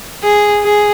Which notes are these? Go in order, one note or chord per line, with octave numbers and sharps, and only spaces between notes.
G#4
G#4